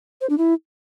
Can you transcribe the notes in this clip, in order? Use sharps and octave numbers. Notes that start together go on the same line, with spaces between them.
C5
D4
E4